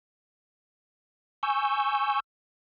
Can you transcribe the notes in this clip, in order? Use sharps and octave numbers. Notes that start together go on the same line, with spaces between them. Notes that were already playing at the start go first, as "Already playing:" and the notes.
G#5 C#6 E6 G6